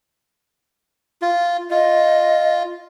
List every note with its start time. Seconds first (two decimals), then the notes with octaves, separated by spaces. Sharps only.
1.22 F4
1.71 F4 D#5